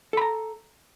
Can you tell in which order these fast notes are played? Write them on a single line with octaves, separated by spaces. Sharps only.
A4 B5 A#5